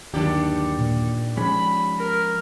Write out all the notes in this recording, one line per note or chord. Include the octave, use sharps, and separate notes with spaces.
G1 D#2 D#3 F#3 D4 G4
A#2
F3 G#3 C#4 B5 B6
A#4